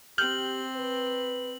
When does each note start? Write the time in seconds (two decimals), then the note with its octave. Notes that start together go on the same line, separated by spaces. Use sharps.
0.18 C4 G4 F6 G6 F#7
0.76 B4